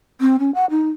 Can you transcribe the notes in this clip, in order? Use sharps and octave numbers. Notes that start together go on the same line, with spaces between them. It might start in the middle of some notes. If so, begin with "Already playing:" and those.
C4
C#4
F#5
D#4